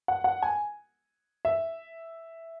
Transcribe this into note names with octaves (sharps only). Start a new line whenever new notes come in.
F#5
F#5
G#5
E5